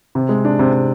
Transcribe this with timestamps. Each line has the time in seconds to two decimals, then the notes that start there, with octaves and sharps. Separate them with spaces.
0.15 C3
0.29 G#3
0.45 D4
0.59 C3
0.73 C3